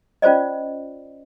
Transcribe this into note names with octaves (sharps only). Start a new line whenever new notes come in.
C#4 F4 C5 D5 D#5